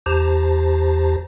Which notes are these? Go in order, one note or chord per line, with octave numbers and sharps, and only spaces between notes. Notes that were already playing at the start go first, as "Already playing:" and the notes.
E2 G4 C5 A5 A#5